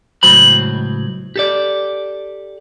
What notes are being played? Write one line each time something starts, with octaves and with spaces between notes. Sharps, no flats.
C#2 A2 F#3 C5 B5
G4 A4 D5